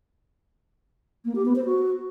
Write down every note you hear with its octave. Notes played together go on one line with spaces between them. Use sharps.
A#3
G4
B3
C5
F#4